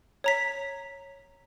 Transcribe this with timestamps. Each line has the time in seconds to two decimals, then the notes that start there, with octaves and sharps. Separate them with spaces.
0.24 C#5 A#5 B6